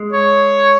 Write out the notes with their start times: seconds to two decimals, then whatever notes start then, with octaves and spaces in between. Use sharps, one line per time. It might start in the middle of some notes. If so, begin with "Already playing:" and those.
Already playing: G#3
0.13 C#5